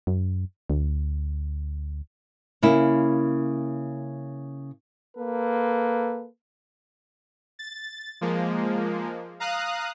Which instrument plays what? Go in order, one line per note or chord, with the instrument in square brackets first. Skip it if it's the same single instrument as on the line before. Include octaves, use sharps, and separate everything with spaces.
[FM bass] F#2
D2
[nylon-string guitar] C#3 A#3 E4
[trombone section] A#3 A4 B4
[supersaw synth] A6
F3 G#3 A#3
F5 A#5 D#6 F#6